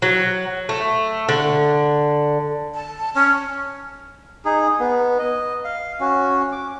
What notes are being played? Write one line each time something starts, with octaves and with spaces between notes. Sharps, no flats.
F#3
A3
D3
A5
C#4
D#4 G#4
B3
D#5
F5
C#4 F#4
D6